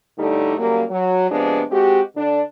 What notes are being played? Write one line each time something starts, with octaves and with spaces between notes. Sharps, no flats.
A2 D3 G3 A3 D#4
C#3 F#3 G3 A#3
F#3
C3 F3 G#3 B3 D4
G#3 C4 F#4 G4
D3 D4